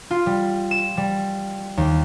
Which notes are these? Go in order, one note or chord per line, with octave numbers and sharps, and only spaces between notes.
F4
G3
E7
G3
D#2